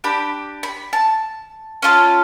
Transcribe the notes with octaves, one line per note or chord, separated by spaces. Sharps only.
D4 G4 B5
B5
A5
C#4 F4 A4